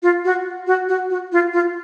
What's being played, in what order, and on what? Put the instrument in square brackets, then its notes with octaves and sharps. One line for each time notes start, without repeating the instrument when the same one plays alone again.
[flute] F4
F#4
F#4
F#4
F#4
F4
F4